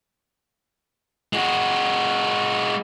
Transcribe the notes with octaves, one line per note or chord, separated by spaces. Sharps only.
G#3 F#4